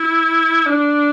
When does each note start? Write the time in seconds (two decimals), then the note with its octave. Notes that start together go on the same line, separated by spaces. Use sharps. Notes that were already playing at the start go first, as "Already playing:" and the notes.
Already playing: E4
0.66 D4